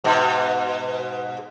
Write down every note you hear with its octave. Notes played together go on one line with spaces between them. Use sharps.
G#2 B2